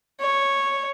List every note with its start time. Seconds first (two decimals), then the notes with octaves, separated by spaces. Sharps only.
0.21 C#5